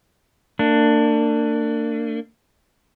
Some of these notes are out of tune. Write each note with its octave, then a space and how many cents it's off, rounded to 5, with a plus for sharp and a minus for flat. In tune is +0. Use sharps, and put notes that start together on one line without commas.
A#3 -40 D4 +15